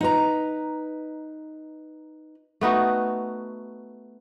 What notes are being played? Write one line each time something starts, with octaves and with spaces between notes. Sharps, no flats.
D#4 B4 A#5
A3 B3 D#4 F#4